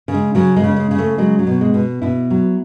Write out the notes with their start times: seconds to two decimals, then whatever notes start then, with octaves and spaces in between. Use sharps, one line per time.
0.08 C#3
0.14 G#3
0.35 C#3 F#3
0.57 G#3
0.64 C#3
0.76 G#3
0.91 C#3
0.98 A3
1.18 F#3 G#3
1.39 F#3
1.47 B2
1.61 G#3
1.74 B2
2.02 B2 E4
2.30 F#3